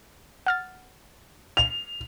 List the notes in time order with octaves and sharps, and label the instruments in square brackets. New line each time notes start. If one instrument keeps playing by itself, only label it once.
[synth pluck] F#5 F6 A6
[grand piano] F7